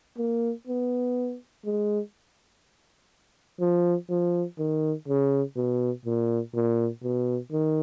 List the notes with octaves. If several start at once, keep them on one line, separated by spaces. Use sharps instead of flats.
A#3
B3
G#3
F3
F3
D#3
C#3
B2
A#2
A#2
B2
D#3